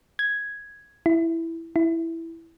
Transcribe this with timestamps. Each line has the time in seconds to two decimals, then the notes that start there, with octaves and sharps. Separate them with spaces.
0.19 G#6
1.06 E4
1.76 E4